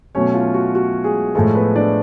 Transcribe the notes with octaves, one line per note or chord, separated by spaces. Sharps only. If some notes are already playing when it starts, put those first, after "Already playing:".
B2 F#3 A3 C#4 C#5
F4
F#4
F#4
G#3 G#4
A2 F3 G#3 A3 A4
B3 B4
D4 D5